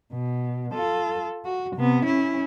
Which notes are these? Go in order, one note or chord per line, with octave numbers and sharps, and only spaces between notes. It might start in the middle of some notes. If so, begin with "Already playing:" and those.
B2
F4 A4
F#4
C3 B3
C#4 E4